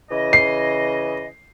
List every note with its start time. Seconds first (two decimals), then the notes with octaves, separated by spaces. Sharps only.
0.11 C#3 E3 D#5
0.33 C7